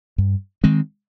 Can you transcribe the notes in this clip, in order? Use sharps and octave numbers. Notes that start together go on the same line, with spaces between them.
G2
D#3 G#3 C4